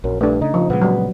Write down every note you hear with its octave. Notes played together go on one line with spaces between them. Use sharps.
A#1 F#2
G2 A3 D4
C#3 D#4
F3
A#2 C#3 G#3 B3
F#3 G3